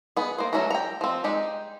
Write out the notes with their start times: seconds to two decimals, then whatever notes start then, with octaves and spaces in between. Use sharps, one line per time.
0.16 B3 G#4
0.38 A#3 C5
0.53 F#3 A3 C#4 F#4 A#5
0.70 G5 A#5
1.01 F3 C4
1.24 G#3 D#4 G4